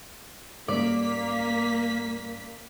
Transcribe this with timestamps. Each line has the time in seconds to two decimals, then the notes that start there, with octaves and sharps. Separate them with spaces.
0.68 G#2 G3 A#3 C#4 D5 B6